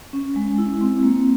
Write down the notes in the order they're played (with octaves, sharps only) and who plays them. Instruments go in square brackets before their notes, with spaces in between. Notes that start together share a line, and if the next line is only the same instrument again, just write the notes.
[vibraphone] C#4
G#3
E4
C4
A#3